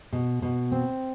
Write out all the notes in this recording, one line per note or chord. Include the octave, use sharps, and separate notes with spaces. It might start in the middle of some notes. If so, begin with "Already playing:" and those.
B2
B2
C4